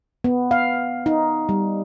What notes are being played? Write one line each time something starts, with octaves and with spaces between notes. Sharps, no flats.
B3
F5
D#4
G3